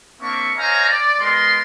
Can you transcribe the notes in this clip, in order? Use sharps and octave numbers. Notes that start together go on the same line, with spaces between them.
A#3 C4 D4 E5 C#6
C5 C#5 D#5 F5 G#5 A#5
D5
G#3 B3 A#4 C6